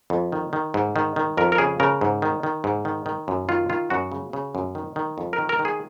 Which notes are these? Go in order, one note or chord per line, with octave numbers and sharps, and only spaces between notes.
F2
D#3
D#3
G#2
D#3
D#3
F2 A#4
A#4
C#3 G#4
C#3 A#4
G#2
D#3
D#3
G#2
D#3
D#3
F#2
D#3 F4
D#3 F4
F#2 F#4
C#3
C#3
F#2
D#3
D#3
F2
A#4
D#3
A#4
D#3
G#4